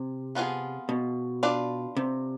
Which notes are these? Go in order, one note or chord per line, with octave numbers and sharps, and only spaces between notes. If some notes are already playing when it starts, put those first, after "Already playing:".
Already playing: C3
F3 B3 F4 G#4
B2
D4 F4 B4 D5
C3